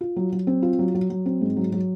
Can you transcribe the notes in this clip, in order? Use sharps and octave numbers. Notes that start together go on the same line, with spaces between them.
F4
F#3
F#3
C4
F4
F#3
F#3
F#3
C4
G#2
F#3
F#3